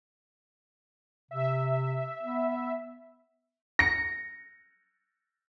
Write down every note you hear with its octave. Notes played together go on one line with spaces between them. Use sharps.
C3 E5
B3
A#6 C#7